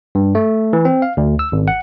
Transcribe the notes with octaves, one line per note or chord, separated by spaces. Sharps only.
G2
A3
E3
C4
F5
D2
E6
G#1
F#5